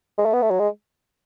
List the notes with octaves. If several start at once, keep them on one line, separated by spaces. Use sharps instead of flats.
G#3
A3
B3
A3
F#3
G#3